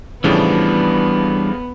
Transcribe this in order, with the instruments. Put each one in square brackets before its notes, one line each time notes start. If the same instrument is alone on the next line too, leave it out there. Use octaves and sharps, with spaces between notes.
[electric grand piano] A2 C#3 F3 [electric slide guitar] E3 G3 D4 [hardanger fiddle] B3